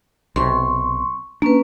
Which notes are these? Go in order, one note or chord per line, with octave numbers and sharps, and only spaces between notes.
B1 C3 C6 C#6
A#3 C#4 D4 B4